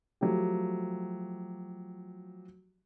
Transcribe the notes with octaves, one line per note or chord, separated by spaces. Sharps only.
F3 F#3 A3 G4